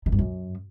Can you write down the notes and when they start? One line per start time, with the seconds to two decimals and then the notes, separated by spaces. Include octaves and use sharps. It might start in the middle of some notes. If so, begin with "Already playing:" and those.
0.06 D#3
0.12 G2
0.19 F#2